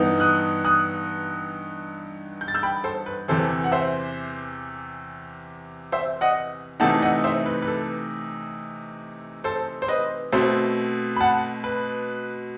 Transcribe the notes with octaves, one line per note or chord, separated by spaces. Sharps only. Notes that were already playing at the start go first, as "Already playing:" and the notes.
Already playing: G2 E3 B3 D#4
D#6 F#6
D#6 F#6
G6
A6
E6 G6
G5 B5
A4 C5
B4
E2 C3 E3 A4 C5
F#5
C5 E5
C5 E5
D#5 F#5
C3 E3 A3 D#4 F#5 A5
D#5 F#5
C5 E5
B4
B4
A4
A4 C5
C5
B4 D#5
B2 A3 C4 C5 E5
B5
F#5 A5
B4